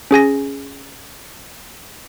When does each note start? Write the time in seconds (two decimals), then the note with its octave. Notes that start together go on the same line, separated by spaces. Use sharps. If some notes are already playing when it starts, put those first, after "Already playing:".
0.11 C#4 G#4 G#5 A#6